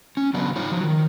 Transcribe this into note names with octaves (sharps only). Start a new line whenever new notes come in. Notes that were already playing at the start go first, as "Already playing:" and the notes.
C#4
C#3 F#3 B3 D4
D#4 F4 C#5
F3 F#3
D#3